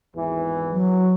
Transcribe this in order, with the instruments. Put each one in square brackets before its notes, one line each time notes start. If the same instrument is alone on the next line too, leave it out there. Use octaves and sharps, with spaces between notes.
[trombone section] G#1 E2 E3
[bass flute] F#3